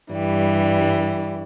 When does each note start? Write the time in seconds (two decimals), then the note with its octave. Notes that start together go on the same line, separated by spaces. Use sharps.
0.11 G2 E3 G3